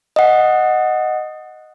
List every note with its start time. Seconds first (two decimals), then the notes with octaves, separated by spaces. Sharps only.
0.16 D#5 F#5